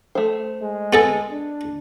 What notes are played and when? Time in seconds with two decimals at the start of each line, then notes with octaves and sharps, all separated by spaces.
0.15 A3 C5
0.62 G#3
0.93 B3 G#4 A4
1.32 D4